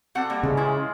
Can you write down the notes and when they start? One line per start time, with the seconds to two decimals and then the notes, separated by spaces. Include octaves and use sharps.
0.15 C4 F#4 A4 D5 F#5
0.30 G3 A#3
0.43 C#3 E3 G#3
0.57 E4 F4 G#4